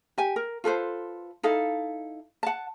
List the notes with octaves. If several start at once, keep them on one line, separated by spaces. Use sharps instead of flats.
G4 G#5
A#4
F4 A4 B4 C5
D#4 E4 A4 F5
F#5 A5